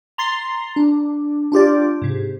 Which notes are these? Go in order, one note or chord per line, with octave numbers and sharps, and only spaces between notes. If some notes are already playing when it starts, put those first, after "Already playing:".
A#5 C6 A6 C7
D4
D4 F4 G4 D5
G#2 C3